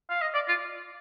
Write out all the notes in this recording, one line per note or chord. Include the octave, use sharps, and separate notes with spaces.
F5
D#5
D5
F4